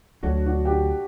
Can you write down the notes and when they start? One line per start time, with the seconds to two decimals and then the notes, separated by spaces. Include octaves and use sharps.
0.23 D2 D3 F#3 D4 F#4
0.46 D4 F#4
0.65 G4
0.70 D4 F#4